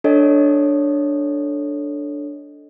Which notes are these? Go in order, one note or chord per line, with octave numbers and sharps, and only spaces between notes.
D4 A4 C#5 D#5